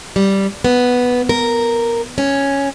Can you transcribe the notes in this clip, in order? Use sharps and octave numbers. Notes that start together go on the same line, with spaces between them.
G3
B3
A#4
C#4